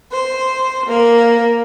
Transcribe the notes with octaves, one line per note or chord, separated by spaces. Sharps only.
C5
A#3